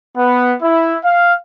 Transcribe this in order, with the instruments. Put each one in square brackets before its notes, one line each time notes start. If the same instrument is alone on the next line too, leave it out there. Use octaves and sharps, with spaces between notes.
[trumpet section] B3
E4
F5